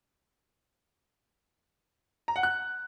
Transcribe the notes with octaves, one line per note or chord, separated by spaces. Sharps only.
A#5
F#5
F#6